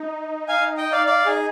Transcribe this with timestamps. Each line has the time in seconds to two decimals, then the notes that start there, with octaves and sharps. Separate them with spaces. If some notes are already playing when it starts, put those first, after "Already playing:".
Already playing: D#4
0.48 F5 G#5
0.77 D#5 G5
0.92 D5 F5
1.06 D5 F5
1.26 G#4